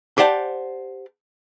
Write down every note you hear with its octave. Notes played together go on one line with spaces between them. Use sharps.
G4 C5 D5 F#5 A5